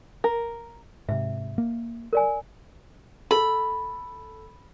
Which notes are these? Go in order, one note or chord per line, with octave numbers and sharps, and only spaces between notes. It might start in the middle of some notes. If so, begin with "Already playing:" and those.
A#4
G#2 C3 E5
A#3
A#4 D5 G#5
A4 B5